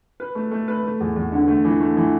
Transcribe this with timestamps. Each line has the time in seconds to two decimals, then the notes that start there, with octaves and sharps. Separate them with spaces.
0.20 B4
0.35 A3
0.51 A3
0.68 B4
0.84 A3
1.00 E2
1.16 E2
1.32 D3
1.48 A3
1.65 E3
1.81 A3
1.97 E3